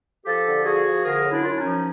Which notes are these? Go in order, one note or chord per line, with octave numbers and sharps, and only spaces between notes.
F3 G4 A4
D3
F3 F#4 G#4
F3
D3 G#4 A#4
F#2
D4 E4
F#2 F4
E4
C#4 D#4
F3